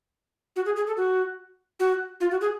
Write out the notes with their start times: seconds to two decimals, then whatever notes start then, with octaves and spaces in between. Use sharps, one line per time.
0.56 F#4
0.65 G#4
0.76 G#4
0.87 A4
0.97 F#4
1.80 F#4
2.20 F4
2.31 F#4
2.41 G#4